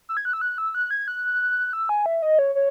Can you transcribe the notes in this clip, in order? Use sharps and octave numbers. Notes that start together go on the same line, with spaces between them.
E6
G#6
F#6
E6
F#6
E6
F#6
G#6
F#6
E6
G#5
E5
D#5
C#5
C#5